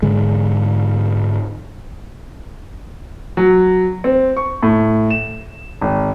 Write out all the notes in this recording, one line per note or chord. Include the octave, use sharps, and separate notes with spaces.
G#2 D3 G#3
F#3
C4
C#6
A2
E7
G#1